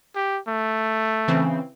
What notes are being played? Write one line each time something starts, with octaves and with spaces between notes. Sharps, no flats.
G4
A3
C#3 E3 C4